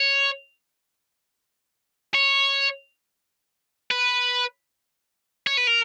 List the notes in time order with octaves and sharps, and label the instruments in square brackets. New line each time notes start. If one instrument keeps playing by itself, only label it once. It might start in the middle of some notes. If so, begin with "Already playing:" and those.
Already playing: [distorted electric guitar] C#5
C#5
B4
C#5
B4
A#4